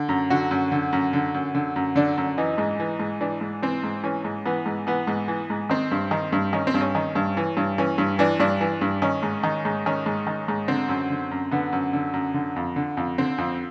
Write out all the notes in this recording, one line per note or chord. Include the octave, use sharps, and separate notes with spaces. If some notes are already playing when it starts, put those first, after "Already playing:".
Already playing: D3
F#2
D3 F#4
F#2
D3
F#2
D3
F#2
D3
F#2
D3 D4
F#2
E3 D#4
G#2
E3
G#2
E3 D4
G#2
E3 C4
G#2
E3 C#4
G#2
E3 B3
G#2
E3 B3
G#2
E3
G#2
D#3 C4
G2
D#3
G2
D#3 C#4
C4
G2
C#4
D#3
G2
E3
G2
E3 C#4
G2
E3 D4
G2 D4
E3
G2
D#3 C#4
G#2
D#3
G#2
D#3 C#4
G#2
D#3
G#2
D3 C4
F#2
D3
F#2
D3 B3
F#2
D3
F#2
D3
F2
D3
F2
D3 C4
F2